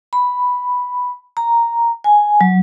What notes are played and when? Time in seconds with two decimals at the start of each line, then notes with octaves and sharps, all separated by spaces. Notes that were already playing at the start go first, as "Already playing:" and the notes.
0.13 B5
1.37 A#5
2.04 G#5
2.41 F#3